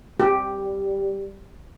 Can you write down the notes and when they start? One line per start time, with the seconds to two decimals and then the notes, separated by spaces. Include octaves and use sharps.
0.20 G3 G4